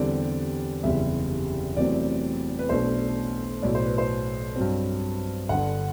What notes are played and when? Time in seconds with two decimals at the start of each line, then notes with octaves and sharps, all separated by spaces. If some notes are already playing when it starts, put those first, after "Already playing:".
Already playing: E2 D3 G3 C4 D5
0.83 F#1 E2 C3 G3 E5
1.77 E2 C3 F#3 A3 C4 D5
2.59 B4
2.69 B1 B2 A3 D4 C5
3.62 B1 A2 F#3 D5
3.75 C5
3.86 B4
3.98 C5
4.56 G2 F#3 C4
5.49 G1 G2 D3 F#5